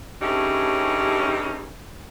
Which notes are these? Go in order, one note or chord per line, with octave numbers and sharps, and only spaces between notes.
G2 C#3 A3 C#4 D#4 G4